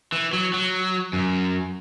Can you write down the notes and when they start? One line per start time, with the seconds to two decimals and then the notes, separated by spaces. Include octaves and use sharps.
0.12 E3
0.33 F#3
0.53 F#3
1.13 F#2